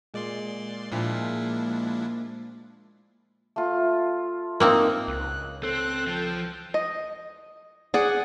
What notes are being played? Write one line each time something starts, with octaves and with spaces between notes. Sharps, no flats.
A#2 G#3 D5 C6
A#2 F3 D4 E4
A3 F4
A#3 C4 D#4
C#2 F#6
C4 A4 F#6
F3 G5
D#5
G#4 D5 F#5